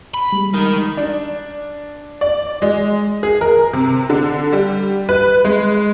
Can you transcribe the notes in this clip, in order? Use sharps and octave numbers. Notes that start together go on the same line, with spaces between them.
B5
G3 G#3
D#4 A#4
D4
D5
G#3
G#4
A#4
C3
D3
G3
B4
G#3